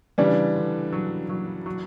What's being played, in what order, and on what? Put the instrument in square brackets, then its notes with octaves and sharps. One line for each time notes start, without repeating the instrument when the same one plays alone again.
[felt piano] C#3 [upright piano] E3 G3 D4
[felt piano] D3
F#3
F#3
F#3